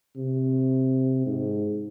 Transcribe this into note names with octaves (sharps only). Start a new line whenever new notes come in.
C3
G#2